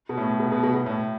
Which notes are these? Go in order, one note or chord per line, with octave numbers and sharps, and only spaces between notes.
B2
A2
B2
B2
B2
B2
A2